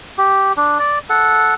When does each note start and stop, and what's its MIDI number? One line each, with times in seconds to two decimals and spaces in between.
0.18 0.52 67
0.57 0.78 62
0.79 0.99 74
1.10 1.54 69
1.10 1.54 78